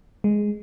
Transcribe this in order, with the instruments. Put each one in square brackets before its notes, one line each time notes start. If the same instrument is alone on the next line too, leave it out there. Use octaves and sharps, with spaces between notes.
[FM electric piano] G#3